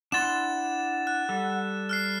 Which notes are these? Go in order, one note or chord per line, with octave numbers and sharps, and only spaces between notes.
D4 E4 F#5 C6 A6 E7
F#6
G3 A4
F6 F#6 C7